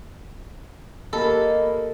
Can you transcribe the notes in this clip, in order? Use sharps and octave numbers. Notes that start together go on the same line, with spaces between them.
A#3 G4 A4 D#5 B5